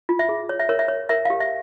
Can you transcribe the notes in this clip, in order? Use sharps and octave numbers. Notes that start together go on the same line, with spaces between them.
F4
E5
G#4
C#5
E5
A#4 C#5
E5
C#5
A#4 E5
G4 F5
E5